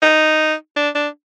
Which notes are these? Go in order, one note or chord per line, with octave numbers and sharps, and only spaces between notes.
D#4
D4
D4